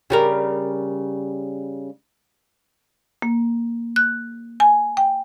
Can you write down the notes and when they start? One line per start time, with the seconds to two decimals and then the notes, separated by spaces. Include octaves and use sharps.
0.10 C#3 G3 A#4
3.22 A#3
3.96 F#6
4.60 G#5
4.97 G5